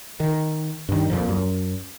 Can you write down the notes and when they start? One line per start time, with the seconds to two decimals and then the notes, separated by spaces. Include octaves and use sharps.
0.20 D#3
0.89 G2 D#3
1.10 F2 A#2 F3
1.29 F#2